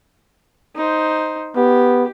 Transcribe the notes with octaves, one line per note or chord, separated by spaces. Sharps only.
D#4 C5
B3 G4